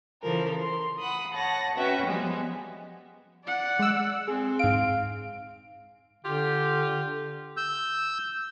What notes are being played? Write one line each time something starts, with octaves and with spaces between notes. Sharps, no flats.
C#3 E3 F3 A4 A#4
C6
F#5 B5 D#6
C#5 F#5 A5 A#6
C#4 F#4 B4 E5 G5
F3 G3 G#3 B3
D5 F#5
G#3 E6
C4 G#4
G#2 F5 D7
D3 F4 G4
E6 G6